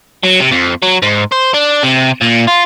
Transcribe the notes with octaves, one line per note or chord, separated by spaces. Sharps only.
F#3
C3
F2
F#3
G#2
C5
D4
C3
A#2
F4